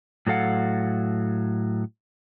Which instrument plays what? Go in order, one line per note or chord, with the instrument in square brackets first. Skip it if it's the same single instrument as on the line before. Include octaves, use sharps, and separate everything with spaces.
[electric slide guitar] A2 F#3 A4 F5 F#5